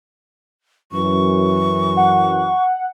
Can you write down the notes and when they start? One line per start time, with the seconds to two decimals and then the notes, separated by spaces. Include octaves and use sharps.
0.92 F#2 E3 C#6
1.97 F#5